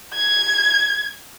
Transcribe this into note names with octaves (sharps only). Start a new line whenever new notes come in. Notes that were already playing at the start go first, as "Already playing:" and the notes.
G#6